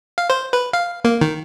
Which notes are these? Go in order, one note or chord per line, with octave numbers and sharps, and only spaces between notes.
F5
C5
B4
F5
A#3
D#3